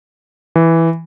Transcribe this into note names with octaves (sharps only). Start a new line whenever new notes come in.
E3